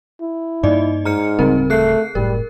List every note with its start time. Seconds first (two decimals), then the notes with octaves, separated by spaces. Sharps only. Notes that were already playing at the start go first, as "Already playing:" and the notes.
0.21 E4
0.63 G2 A#3 D#4 D5 D#5
1.05 G#2 A#5 F6 C#7
1.39 D1 C#3 G3 C4 A#4
1.70 A3 G#4 F#6 C7
2.15 F#1 A2 G3 A#4